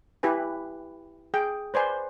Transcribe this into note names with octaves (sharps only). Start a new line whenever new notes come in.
E4 G4 B4 G#5
G#4 G5
B4 C5 D5 G#5